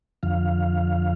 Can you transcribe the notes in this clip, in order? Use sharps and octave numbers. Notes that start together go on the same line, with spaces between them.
F2 D3 F3 F5